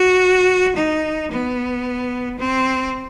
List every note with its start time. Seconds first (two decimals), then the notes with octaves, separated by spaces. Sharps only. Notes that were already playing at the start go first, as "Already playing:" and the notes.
Already playing: F#4
0.76 D#4
1.32 B3
2.39 C4